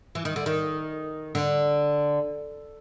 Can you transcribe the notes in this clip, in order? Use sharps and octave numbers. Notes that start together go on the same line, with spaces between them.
E3
D#3
D3
D#3
D3